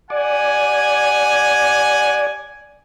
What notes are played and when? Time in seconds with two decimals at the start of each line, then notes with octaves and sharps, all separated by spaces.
0.10 G4 D5 F#5 G#5